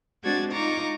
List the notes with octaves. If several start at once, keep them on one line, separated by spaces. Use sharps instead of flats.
G#3 C4 D4 F#4 G#6 A6
D#4 F4 A#5 C#6 D6